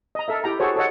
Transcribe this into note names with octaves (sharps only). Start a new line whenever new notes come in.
D#5 A#5
A4 A#4 E5
E4 G4 G5 A#5
F#4 G#4 A4 C5 C#5
A4 C#5 D#5 F#5